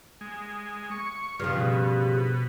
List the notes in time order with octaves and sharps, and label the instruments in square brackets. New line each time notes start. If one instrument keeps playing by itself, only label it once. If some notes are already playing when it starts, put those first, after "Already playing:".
[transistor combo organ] G#3
C#6
[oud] G2 C#3 F3 [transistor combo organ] F4
[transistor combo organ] B2